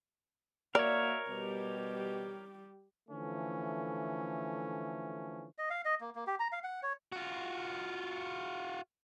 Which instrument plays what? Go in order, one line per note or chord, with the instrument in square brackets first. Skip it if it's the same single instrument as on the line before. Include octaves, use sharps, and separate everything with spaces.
[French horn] A#3 [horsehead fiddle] F#4 E5 [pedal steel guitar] A#4 C#5 [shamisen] D5
[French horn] B2 [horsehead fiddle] G3 G4
[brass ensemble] D3 E3 F3 A3 C#4
[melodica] D#5
F5
D#5
A#3
A#3
G4
A#5
F5
F#5
C#5
[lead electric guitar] F4 F#4